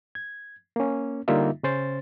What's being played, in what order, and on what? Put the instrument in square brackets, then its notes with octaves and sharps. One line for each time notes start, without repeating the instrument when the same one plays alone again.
[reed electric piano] G#6
A#3 C#4
D3 G3 A#3 D#4 F4 E5
C#3 C#4 C5 A6